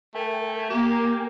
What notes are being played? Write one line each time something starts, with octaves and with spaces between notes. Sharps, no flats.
A3 A#4 G5 G#5
A#3 G4